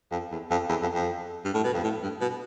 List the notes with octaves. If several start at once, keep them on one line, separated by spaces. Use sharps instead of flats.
F2
E2
F2
E2
F2
F2
G2
A2
B2
F2
A2
G2
B2